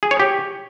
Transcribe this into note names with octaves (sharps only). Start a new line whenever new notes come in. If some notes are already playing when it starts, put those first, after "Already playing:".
G#4
C#5
G4